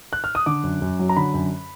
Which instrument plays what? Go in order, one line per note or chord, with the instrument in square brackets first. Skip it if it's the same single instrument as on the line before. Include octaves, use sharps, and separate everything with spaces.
[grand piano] F#6
F6
D#6
D3 D6
F#2
F#2
F#3
A#5
D3 B5
F#2